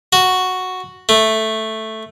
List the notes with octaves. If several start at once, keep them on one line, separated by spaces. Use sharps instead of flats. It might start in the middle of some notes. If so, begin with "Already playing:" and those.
F#4
A3